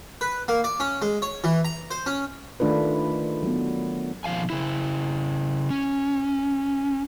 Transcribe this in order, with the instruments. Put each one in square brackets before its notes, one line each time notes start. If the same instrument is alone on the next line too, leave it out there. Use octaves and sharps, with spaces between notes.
[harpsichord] B4
A#3
D5
C#4
G#3
C#5
E3
A#5
C5
C#4
[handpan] D#3 A3 D4 F4 B4
F#3 B3
[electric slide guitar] B2 D#3 F3 F5 G#5
C#3 E4
C#4